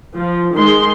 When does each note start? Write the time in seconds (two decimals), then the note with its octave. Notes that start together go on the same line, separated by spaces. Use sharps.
0.15 F3
0.55 D#3 G#3 C6